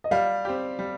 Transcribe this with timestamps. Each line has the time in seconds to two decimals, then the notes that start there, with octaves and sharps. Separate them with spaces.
0.04 D#5
0.11 G3 D5 F5
0.45 C4 G4
0.79 G3